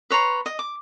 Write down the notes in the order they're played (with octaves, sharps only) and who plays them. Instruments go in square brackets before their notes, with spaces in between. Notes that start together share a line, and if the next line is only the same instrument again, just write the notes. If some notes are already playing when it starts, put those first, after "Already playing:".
[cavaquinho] B4 C#5 A#5 C6
D#5
D6